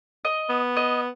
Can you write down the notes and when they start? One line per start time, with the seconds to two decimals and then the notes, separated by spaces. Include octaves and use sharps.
0.25 D#5
0.49 B3
0.77 D#5